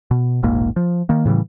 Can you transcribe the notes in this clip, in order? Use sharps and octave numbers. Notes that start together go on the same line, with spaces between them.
B2
E1 A#1 G#2 A#3
F3
D#3 A#3
A2 C#3 E3 G3